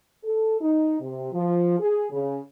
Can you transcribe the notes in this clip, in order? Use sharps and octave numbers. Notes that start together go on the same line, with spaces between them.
A4
D#4
C3
F3
G#4
C#3